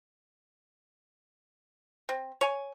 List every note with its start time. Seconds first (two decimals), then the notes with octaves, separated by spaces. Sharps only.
2.09 C4
2.41 C#5 G#5